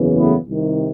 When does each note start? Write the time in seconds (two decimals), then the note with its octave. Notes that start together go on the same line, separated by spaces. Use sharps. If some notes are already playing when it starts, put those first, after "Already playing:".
Already playing: F#1 E2 C#3 E3
0.18 A3 B3
0.47 C2 C3 D#3